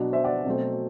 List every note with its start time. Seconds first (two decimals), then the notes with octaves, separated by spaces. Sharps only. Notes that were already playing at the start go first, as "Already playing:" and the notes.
Already playing: B2 F#3 B3 D4
0.13 C5 E5
0.24 D5 F#5
0.46 B2 F#3 A3 C4